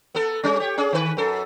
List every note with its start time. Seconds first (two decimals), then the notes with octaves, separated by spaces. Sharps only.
0.15 B3 A4
0.43 G3 C#4
0.60 G4 C#5
0.78 C#4 G#4
0.92 D#3 B4
1.17 F#2 A4